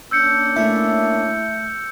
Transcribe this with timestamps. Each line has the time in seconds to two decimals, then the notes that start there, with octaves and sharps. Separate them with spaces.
0.11 A#3 C#4 D4 E6 G6 C#7
0.56 A3 E4